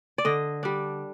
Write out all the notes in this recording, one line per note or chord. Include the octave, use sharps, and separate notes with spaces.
D5
D3 D#5
G3 D4